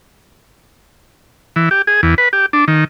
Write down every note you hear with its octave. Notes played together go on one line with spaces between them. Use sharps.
E3
G4
G#4
E2
B4
G4
D4
D#3